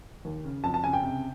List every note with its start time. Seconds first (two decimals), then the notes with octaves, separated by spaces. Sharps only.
0.25 D#2
0.45 C#3
0.64 F2 A5
0.74 A5
0.84 C#3 G#5
0.93 G5
1.03 C3